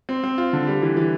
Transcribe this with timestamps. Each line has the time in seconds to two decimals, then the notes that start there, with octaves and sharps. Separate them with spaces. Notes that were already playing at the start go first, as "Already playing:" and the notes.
0.09 C4
0.24 C4
0.38 F4
0.53 D3
0.67 G3
0.82 E3
0.97 E3